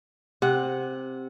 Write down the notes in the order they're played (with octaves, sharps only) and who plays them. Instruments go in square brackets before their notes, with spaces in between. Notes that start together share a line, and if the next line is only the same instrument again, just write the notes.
[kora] C3 F#5